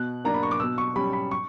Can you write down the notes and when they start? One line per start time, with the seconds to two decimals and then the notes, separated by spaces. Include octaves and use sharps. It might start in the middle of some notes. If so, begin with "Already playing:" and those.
Already playing: B2 F#6
0.24 A#3 D4 A#5
0.34 B5
0.43 C#6
0.51 D6
0.60 B2 E6
0.78 C#6
0.96 G3 C#4 B5
1.13 B5
1.31 C#6